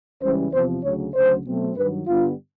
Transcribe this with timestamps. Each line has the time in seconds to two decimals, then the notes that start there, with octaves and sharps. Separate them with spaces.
0.22 C#2 C#3 E3 G3 C5
0.53 E2 C3 F3 C5
0.84 D2 C#3 F#3 C#5
1.15 D2 C#3 F#3 C5
1.46 B2 F#3 A3 C4
1.77 G2 D#3 F#3 B4
2.08 G2 D3 G3 B3 F4